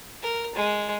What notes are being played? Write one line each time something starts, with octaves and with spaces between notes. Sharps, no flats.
A#4
G#3